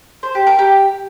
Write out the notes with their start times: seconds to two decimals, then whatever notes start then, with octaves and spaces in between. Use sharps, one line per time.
0.23 C5
0.35 G4
0.47 A#4
0.59 G4